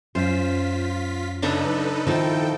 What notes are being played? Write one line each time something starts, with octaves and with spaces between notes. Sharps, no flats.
F#2 F4 C5 B6
C#3 D4 D#4 A4 B4 A#5
D#3 F3 D#4 E4 A4 G5